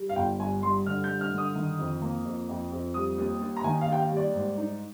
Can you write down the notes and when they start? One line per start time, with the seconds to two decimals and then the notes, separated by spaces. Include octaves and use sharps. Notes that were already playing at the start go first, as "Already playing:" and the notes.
Already playing: G3
0.09 F5
0.16 G1 G5
0.39 G2 G#5
0.63 G2 C6
0.86 D3 F6
1.04 G6
1.10 G2
1.21 F6
1.32 D3
1.38 D#6
1.55 D#3
1.79 F2
2.01 A#3
2.25 F2
2.49 F2
2.72 F2
2.94 G3 D#6
3.18 D#2
3.41 D#2
3.57 A#5
3.64 D#3 G#5
3.81 F5
3.88 D#2 G5
3.99 F5
4.10 G3
4.17 D5
4.34 G#2
4.58 D#4